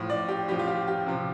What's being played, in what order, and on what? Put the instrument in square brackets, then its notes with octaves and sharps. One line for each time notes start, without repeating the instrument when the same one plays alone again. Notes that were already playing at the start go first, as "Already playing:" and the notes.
Already playing: [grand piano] A2 F3
D5
G4
A2 F3 G4
F4
G4
G4
C3 F3